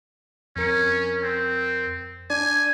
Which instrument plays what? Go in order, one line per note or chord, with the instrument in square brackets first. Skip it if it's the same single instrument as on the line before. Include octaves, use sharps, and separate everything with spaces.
[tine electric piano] F2 A#4 C#7 [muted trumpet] C#4
[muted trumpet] C4
[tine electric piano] D4 D5 [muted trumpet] G#5